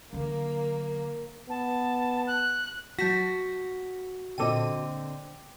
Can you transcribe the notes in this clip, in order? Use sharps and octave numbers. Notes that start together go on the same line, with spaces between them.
D3 F#3 A#3
B3 A5
F#6
F#3 F#4 A5 G6 A#6 B6
A#2 D3 C4 A4 D#5 G5 D6 D#7